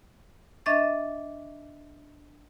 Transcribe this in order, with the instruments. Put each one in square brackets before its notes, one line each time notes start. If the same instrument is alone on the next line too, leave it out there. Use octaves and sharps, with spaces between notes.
[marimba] D4 D#5 E5 C#6 A6